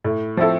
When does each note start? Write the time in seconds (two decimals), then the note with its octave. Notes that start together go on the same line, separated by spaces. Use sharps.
0.04 A2
0.37 F3 C4 E4 A4